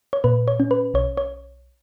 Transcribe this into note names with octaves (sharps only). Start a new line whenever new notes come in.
C#5
A#2 B4
C#5
C#4
B4
B1 C#5
C#5